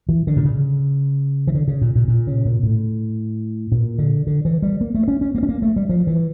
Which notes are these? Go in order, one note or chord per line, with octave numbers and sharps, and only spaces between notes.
E3
D3
A#2
C#3
E3
D3
C#3
A#2
A#2
A#2
C#3
A#2
A2
A#2
D3
D3
E3
G3
A#3
A3
C#4
C#4
A#3
C#4
A#3
A3
G3
F3
E3